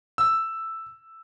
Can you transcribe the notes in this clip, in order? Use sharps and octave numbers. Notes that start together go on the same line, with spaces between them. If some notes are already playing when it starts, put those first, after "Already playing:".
E6